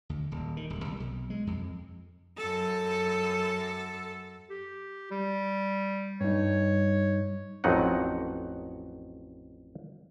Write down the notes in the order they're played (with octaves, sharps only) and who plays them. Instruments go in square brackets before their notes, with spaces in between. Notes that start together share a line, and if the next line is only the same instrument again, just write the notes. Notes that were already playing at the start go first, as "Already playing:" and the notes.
[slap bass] D2
D#1
D#3
D#1
C2
B1
G#3
F2
[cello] F#2 A4
[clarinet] G4
G3
[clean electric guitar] G2 D#4 [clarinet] C#5
[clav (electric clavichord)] A1 F2 F#3 D#4 F#5